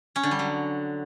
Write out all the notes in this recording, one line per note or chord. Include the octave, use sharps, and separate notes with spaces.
C#4
D3
G3
F#3